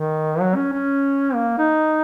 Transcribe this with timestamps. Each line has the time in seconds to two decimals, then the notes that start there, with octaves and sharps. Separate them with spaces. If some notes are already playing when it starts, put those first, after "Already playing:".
Already playing: D#3
0.41 F#3
0.56 C#4
0.73 C#4
1.35 A#3
1.59 D#4